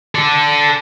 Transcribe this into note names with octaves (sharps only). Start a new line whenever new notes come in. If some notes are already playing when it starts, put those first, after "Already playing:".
A4 D5